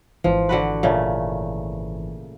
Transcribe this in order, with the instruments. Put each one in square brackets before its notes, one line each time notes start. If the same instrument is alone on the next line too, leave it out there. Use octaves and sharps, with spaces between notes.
[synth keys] G#1 E3 [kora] F3
[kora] D3 F#4 B4
A#2 C#3 A3